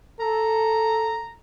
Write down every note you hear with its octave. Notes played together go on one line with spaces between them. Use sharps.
A4 A#5